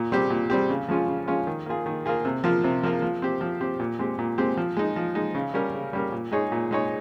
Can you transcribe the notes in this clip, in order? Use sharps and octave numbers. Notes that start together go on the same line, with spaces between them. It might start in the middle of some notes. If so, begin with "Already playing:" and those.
Already playing: A#2
G3 C4 G4
A#2
G3 C4 G4
C#3
F3 G#3 C#4 F4
C#3
F3 G#3 C#4 F4
D#3
A#3 F4 G#4
D#3
A#3 F4 G#4
C3
F3 A#3 F4
C3
F3 A#3 F4
F3
C4 G4
F3
C4 G4
A#2
G#3 C4 G4
A#2
G#3 C4 G4
F3
G#3 D#4
F3
G#3 D#4
C#3
G3 C#4 G4 A#4
C#3
G3 C#4 G4 A#4
A#2
G#3 D#4 G#4 C#5
A#2
G#3 D#4 G#4 C#5